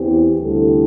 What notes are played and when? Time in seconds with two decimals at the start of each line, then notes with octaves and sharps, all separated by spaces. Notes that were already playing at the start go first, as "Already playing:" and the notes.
Already playing: E2 E3 C4 G4
0.39 D2 C3 G3 E4 A4